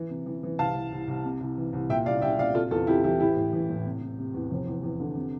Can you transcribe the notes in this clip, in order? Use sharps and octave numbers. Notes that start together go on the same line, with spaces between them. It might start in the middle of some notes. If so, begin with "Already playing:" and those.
Already playing: E3
C3
E3
E3
C2 F5 A5
E3
C2
C2
C3
C2
E3
C2
A#2 E5 G5
C2 D5 F5
C2 E5 G5
A#2 D5 F5
C3 F4 A4
E2 F4 A4
C3 E4 G4
E3 E4 G4
A1 E4 G4
A2
E3
A2
C3
C3
C3
E2
F1
E2
E2
D3
C3